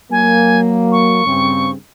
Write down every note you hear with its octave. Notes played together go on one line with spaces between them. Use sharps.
F#3 A#3 G#5
C#6
G2 C#3 C4